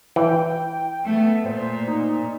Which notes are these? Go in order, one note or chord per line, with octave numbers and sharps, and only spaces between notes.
E3 G5
A3 B3
A#2 C5
D#4